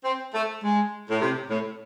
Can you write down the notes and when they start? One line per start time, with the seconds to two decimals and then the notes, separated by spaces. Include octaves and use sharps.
0.04 C4
0.34 A3
0.63 G#3
1.10 A2
1.21 C3
1.49 A2